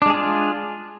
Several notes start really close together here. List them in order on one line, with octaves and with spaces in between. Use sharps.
D4 G#3 G#4 F4